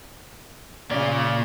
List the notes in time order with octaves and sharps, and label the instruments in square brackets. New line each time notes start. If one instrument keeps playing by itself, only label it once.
[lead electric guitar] A#2 D5 [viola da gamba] C#3